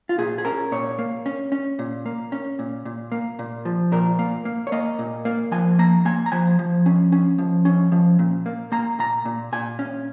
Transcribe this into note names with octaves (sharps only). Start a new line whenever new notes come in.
F4
A#2 G#4
G#4
C#4 A#4
A#2 C#5
A#3
C#4
C#4
A#2
A#3
C#4
A#2
A#2
A#3
A#2
F3
A#2 A#4
A#3
A#3
C#5
A#3 D#5
A#2
A#3
F3 G#5
A#3 A#5
A#3 G#5
A#5
F3 G#5
F3
C#4
C#4
F3
C#4
F3
A#2
A#3
A#3 A#5
A#2 A#5
A#2
A#2 G#5
C#4